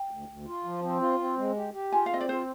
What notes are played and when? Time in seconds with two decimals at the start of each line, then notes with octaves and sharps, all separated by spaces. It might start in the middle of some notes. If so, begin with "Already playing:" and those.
Already playing: G5
0.11 D2
0.28 D2
0.46 F4
0.64 F3
0.83 C4
1.01 F4
1.20 C4
1.38 G#3
1.56 G4
1.74 G4
1.92 F4 G#5
2.06 F5
2.10 C4 D#5
2.20 D5
2.29 F4 C5